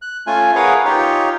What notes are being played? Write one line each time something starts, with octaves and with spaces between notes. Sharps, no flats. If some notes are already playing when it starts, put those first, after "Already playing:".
F#6
A3 C#4 F4 G#5
G#4 A#4 B4 C#5 F5 F#5
D#4 F4 G4 C#5